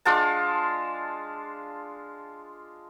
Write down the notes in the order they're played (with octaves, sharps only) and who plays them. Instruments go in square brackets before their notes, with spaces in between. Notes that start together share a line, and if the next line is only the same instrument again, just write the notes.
[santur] G#3 D4 F4 A5